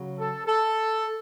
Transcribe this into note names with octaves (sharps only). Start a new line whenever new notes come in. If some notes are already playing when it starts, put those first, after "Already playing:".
Already playing: C#3 F#3
A4
A4